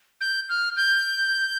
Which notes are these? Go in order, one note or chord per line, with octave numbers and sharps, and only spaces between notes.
G6
F6
G6